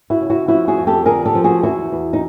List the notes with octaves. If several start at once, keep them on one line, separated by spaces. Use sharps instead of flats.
E4 F#4
C#3
E4 F#4
F3 E4 F#4
F#4 G#4
F2
G4 A4
D3 G#4 A#4
G4 A4
F3
F#4 G#4
E2 E4 F#4
E2
D#4